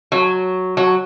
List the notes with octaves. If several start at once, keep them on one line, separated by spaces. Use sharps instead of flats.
F#3
F#3